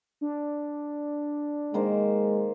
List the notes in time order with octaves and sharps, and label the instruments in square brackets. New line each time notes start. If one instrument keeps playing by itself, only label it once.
[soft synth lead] D4
[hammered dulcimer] D#3 A#3 C5 [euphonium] G#3